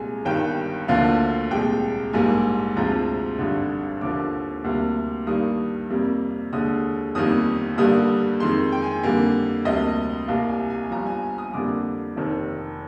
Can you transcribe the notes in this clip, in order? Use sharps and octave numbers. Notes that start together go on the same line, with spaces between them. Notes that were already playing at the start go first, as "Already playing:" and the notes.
Already playing: C2 A#2 G#3 G#5
G1 G2 D#3 G5
D2 D3 F3 A#3 F5
C2 A#2 G#3 G5
A#1 G#2 G3 A#3 G#5
D2 C3 F3 G#3 A#5
G#1 G2 D3
D#2 D3 F3 A#3 D6
D2 C3 G3 A#3
G2 D#3 G3 A#3 D#6
F2 C3 G3 A#3
D#2 D3 G#3 D#6
G1 F2 D#3 G3 A#3 D#6
G2 D3 G3 A#3 D#6
F2 D#3 G#3 C6
G5
G#5
F2 D3 G3 A#3
D2 C3 G3 A#3 D#5
C2 C3 G3 A#3 F5
G#5
G#5
G1 G2 F3 A#5
G#5
G#5
D#6
F2 D3 G3 A#3 D6
F1 F2 D#3